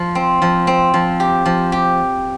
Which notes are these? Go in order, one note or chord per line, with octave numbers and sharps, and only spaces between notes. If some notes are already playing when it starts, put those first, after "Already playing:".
Already playing: F3
C4
F3
C4
F3
G4
F3
G4